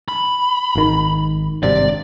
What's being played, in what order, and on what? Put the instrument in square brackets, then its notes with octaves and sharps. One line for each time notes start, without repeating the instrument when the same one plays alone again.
[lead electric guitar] B5
[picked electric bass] G#1 D#3
[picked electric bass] G#1 G2 C3 [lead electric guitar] D5